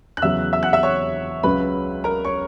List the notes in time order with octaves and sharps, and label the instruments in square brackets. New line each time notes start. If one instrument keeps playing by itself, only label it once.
[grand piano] F#6
E2 C#3 F#3 E5 E6
E5 E6
F#5 F#6
E5 E6
C#5 C#6
C#2 C#3 F#3 B4 B5
A#4 A#5
C#5 C#6